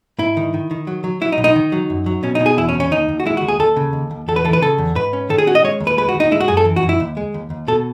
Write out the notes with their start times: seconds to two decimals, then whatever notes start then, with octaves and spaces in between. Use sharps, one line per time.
0.19 G#2 E4
0.37 D#3
0.54 D#3
0.71 D#3
0.87 F#3
1.04 F#3
1.21 F#3 E4
1.32 D#4
1.38 B1
1.44 D#4
1.56 D#3
1.72 F#3
1.90 F#2
2.06 F#3
2.23 B2 C#4
2.35 B2 D#4
2.46 G#4
2.57 E2 E4
2.69 C#4
2.74 E2
2.80 C#4
2.91 D#2 D#4
3.09 D#2
3.20 F#4
3.25 G#3 E4
3.37 D#2 F#4
3.48 G#4
3.59 D#2 A4
3.76 C#3
3.93 D#2
4.11 D#2
4.28 E2 A4
4.36 B4
4.45 E3 A4
4.53 B4
4.62 C#3 A4
4.78 E2
4.95 G#2 B4
5.13 C#4
5.29 D#3 A4
5.38 G#4
5.47 C#4 F#4
5.55 D#5
5.64 G#3 C#5
5.80 D#2
5.87 B4
5.97 G#3 B4
6.09 F#4
6.15 D#2
6.20 D#4
6.31 G#3 E4
6.40 F#4
6.48 F#2 G#4
6.57 A4
6.65 E3
6.76 F#4
6.82 F#2
6.89 E4
7.00 D#2
7.17 G#3
7.34 D#2
7.50 D#2
7.67 B2 A4